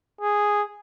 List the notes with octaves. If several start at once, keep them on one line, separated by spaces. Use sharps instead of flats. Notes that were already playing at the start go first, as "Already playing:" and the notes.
G#4